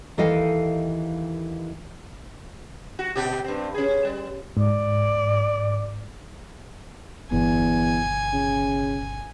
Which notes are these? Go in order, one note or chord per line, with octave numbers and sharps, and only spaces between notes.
D#2 E3 A4 D#5 F5 G5
F#4
B2 G4
G2 C4
C#4 G#4
G3
G#2 D5
G1 E2 B2 G#5
C#3